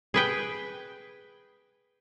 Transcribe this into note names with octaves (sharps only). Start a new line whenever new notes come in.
G#4 B4 G5